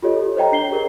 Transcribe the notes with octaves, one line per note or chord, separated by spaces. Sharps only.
F4 G4 A4 C#5 D#5
A4
C5 C#5 D#5 G5 A#5
D4 C7 G7
G4 G#4 A#4 C#5